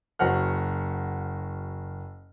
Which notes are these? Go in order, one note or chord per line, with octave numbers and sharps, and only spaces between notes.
F#1 F#4 C5 F#5 F6